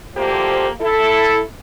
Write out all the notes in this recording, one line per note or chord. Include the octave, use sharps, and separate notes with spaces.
D2 F3 A#3 G4 A4 C5
E4 A4